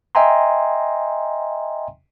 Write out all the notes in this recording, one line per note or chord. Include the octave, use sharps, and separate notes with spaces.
D#5 E5 G5 G#5 A#5 C6